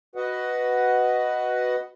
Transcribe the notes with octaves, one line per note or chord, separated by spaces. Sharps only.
F#4 B4 D#5 F#5